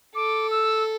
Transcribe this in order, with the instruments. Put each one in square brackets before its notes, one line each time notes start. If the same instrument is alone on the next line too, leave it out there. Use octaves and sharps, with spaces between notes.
[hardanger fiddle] A4 [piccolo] D6
[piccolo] E6